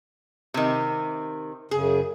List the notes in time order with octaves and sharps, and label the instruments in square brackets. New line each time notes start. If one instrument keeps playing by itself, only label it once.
[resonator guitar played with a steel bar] C3 D#3
[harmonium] F#2 C#3 [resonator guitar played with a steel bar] G#4